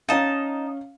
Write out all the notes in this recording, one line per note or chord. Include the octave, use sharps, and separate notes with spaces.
C#4 D#4 F5 A5